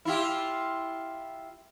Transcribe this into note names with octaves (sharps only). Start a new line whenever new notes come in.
E4 F4 G4